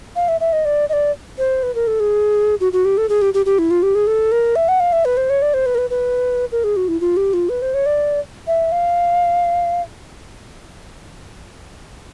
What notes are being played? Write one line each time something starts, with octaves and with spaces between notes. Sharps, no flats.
F5
E5
E5
D#5
D5
D#5
D5
C5
B4
A#4
A4
G#4
F#4
F#4
G4
A4
G#4
G4
G4
G4
E4
F4
G4
G#4
A4
A#4
E5
F#5
F5
E5
B4
C5
C#5
D5
C5
B4
A#4
B4
B4
A#4
G#4
F#4
E4
F4
G4
F4
B4
C5
C#5
D5
E5
F5